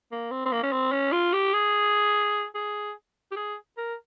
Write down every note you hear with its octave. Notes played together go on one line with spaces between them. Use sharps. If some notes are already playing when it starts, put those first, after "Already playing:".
A#3
C4
C4
A#3
C#4
C4
C#4
F4
G4
G#4
G#4
G4
G#4
A#4